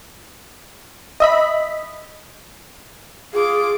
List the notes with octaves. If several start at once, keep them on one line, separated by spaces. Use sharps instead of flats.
D#5 E5 B5
F4 G#4 D6